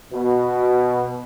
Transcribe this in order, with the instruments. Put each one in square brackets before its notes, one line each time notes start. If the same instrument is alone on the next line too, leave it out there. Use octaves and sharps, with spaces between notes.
[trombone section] B2